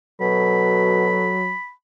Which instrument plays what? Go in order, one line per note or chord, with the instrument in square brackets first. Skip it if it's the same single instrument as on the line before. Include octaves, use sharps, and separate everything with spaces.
[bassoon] B2 [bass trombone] F#3 [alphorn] A4 [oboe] B5